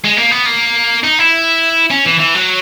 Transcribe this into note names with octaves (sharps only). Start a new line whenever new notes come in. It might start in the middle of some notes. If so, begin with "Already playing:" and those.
G#3
A#3
B3
A#3
D#4
E4
C#4
E3
E3
F#3